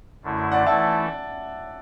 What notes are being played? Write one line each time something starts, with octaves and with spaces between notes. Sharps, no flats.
F#2 D3 A3 E4
D5 F#5
E3 A3 E4 A4 E5 A5